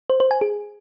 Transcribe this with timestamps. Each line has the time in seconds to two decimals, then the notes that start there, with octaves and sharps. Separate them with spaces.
0.10 C5
0.20 C5
0.31 G#5
0.41 G#4